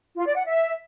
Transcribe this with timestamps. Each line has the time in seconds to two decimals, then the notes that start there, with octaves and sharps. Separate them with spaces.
0.16 F4
0.26 D5
0.36 F#5
0.46 E5